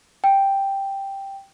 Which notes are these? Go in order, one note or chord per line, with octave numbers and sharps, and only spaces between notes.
G5